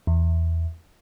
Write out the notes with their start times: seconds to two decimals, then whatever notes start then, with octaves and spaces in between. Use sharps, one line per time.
0.07 E2